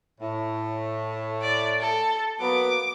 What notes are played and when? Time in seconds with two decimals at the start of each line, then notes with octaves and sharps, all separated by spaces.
0.20 A2
1.42 D5
1.81 A4
2.40 F#3 A#3 B3 D6